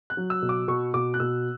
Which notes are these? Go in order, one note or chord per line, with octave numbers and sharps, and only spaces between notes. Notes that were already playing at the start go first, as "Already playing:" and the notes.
F#6
F#3
E6
B2
D6
B2 C#6
B2 D6
F#6
B2 E6